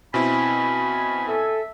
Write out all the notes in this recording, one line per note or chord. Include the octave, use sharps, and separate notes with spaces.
B2 C4 E4 G#5 B5
A4 E5